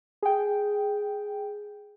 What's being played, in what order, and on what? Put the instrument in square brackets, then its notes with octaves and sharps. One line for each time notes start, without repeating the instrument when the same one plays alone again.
[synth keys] G#4 G5